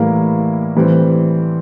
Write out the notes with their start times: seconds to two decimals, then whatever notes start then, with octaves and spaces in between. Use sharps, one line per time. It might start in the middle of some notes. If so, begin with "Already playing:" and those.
Already playing: A2 E3 G3 A#3 E4
0.75 A2 E3 G3 C4